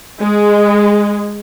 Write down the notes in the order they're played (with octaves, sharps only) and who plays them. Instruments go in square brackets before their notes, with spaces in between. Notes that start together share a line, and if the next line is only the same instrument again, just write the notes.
[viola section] G#3